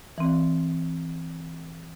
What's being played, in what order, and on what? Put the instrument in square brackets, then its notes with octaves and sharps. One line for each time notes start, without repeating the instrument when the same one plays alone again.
[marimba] E3 C4